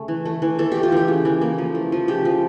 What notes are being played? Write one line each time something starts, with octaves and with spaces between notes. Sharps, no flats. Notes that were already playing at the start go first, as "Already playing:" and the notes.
Already playing: C#3 A3 C#4
E3
A3
E3
E3 A4
A3 G4
F4
E3 G4
C#3
E3
A#3
F3
A3
F3
C#3 G4
F3